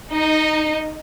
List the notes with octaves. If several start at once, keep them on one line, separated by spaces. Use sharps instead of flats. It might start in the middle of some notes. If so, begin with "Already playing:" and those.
D#4